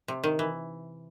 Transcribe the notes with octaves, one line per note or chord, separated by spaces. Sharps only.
C3
D#3
E3